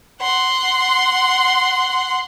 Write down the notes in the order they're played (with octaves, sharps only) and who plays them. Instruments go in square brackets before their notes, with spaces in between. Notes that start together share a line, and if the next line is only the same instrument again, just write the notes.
[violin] F#5 C6